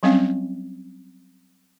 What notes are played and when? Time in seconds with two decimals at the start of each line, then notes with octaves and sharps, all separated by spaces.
0.03 F#3 G3 C4 C#4 F5